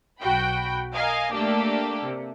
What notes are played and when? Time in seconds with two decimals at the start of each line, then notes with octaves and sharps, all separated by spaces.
0.21 B1 F#4 G5 B5
0.94 A#4 D#5 F5 G#5
1.33 A3 A#3 D4 G4 A4
2.04 C3